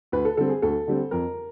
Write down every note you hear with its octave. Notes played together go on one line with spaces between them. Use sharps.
D2 B4
A4
D3 G3 C4 A4
G#4
D2 A4
D3 G3 C4
F2 A#4